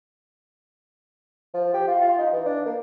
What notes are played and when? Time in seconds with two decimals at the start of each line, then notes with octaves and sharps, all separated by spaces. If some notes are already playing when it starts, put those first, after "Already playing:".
1.54 F3
1.74 G4
1.88 F4
2.01 F4
2.18 D#4
2.33 E3
2.45 D4
2.66 A#3